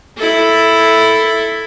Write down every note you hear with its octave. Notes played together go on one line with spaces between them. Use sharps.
E4 A4